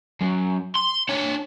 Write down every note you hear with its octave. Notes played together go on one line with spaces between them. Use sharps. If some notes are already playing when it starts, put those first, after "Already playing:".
F#2
C6
D4 C#5